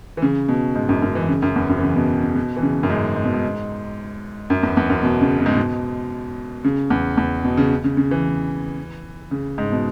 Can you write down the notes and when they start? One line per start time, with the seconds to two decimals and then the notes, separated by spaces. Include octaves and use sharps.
0.17 E3
0.22 C#3
0.49 B2
0.75 G#2
0.89 F#2
1.02 F#2
1.15 E3
1.29 C#3
1.42 F#2
1.56 E2
1.69 F#2
1.78 E3
1.83 C#3
1.96 B2
2.22 C#3
2.35 B2
2.56 E3
2.63 C#3
2.83 F#2
2.90 G#2
3.16 G#2
3.25 B2
3.34 G#2
4.50 F#2
4.63 E2
4.77 E2
4.89 F#2
5.03 B2
5.21 C#3
5.39 B2
5.46 G#2
5.54 B2
6.64 C#3
6.90 E2
7.17 E2
7.45 B2
7.57 C#3
7.84 C#3
7.97 C#3
8.11 E3
9.31 C#3
9.58 G#2
9.72 B2